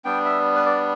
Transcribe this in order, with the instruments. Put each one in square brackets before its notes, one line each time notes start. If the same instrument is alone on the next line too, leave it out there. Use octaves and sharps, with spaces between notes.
[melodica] G3 B3 D4 G5
E5
B4
D5